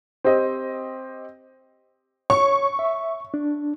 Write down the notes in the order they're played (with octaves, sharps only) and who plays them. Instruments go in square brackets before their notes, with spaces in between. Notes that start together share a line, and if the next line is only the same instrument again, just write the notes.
[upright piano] C4 G4 C5 D#5
[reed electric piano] C#5 [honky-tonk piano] C#6
[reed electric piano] E5
D4